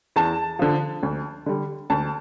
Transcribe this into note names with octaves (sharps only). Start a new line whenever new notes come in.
E2 A5
D3 F3
D2
D3 G3
D2 A5